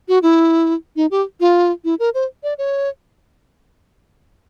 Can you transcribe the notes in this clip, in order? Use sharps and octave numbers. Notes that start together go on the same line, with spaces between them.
F#4
E4
D#4
G4
F4
E4
A#4
C5
D5
C#5